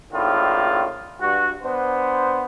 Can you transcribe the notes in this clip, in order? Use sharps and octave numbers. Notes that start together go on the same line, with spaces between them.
G#1 A2 D3 D#3 F4
G2 F#4
B3 D4 C5